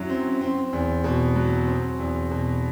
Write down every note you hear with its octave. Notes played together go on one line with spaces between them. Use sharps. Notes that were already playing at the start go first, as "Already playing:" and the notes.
Already playing: F#2 F#3 E4
C4
C4
E2
B2
F#3
C4
E2
B2